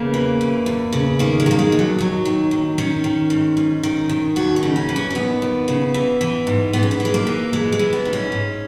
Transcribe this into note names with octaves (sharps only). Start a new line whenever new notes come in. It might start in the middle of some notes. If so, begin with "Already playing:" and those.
Already playing: E2 C#3 A#3
E3
E2
E2
C#3
D#3 A#3
G#3
D#3 A#3
G#3
D#2
F#3
D#2 F#3
D#3
D#3
D#3 C#4
D#3
G#2
G#2
D#3
D#3
D#2 F#4
D#4
C#3
C#4
E3
C#4
C#4
D#2 B3
D#2
C#3
E3
E3
G#2
G#2 B3
C#4
B3
E3
G#3
A#3
E3
E3 G#3
G#3
E3
B3
G#2
C#4
G#2